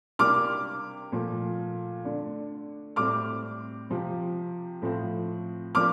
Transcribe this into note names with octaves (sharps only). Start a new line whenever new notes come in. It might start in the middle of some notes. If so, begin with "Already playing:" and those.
C3 G3 A#3 D4 D6 F6
A#2 F3 A3
D3 A3 D4
A2 G3 C4 D6 F6
C3 F3 C4
A2 F3 C4
F3 A#3 D4 D6 F6